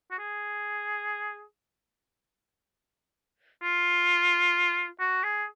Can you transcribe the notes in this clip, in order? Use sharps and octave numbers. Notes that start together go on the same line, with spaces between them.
F#4
G#4
F4
F#4
G#4